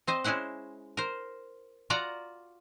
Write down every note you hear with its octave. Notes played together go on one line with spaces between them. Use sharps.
C4 C5 D#5
G#3 C#4 E4 C5 F#5
A#4 C5
F4 F#4 D5 A#5